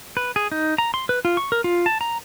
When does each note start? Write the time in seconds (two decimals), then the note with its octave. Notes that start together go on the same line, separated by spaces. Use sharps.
0.17 B4
0.36 G#4
0.52 D#4
0.78 A#5
0.94 C6
1.09 B4
1.25 F4
1.37 C#6
1.52 A#4
1.64 F4
1.86 A5
2.01 A#5